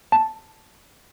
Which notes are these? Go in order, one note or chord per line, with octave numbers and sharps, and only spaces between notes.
A5